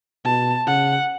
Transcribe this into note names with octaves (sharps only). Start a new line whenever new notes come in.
B2 A5
C#3 F#5